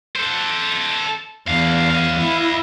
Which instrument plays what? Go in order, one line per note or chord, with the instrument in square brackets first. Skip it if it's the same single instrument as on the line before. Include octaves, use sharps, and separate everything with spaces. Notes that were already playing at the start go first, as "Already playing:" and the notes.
[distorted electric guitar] A4 C5
[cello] E2 [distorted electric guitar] D4 F5
[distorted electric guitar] D#5 F5
[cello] E4